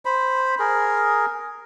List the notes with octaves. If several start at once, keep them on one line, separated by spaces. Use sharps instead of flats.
C5 B5
G#4 A#4